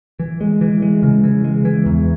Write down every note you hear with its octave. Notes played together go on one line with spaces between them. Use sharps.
E3
G#3
E3
G#3
C#3
E3
G#3
E3
E2